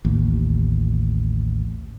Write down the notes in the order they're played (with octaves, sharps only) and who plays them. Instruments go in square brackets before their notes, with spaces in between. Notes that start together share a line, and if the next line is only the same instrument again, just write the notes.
[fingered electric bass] A1 D#2